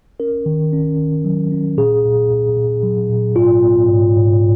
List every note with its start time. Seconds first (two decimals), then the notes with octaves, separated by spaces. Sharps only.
0.20 C#4 A#4
0.46 D#3
0.73 C#4
0.98 D#3
1.25 F#3
1.52 C#4
1.77 A#2 G#4
2.05 A#2
2.31 A#2
2.57 A#2
2.83 F#3
3.09 A#2
3.36 G#2 F4
3.63 B3
3.88 G#2
4.15 G#2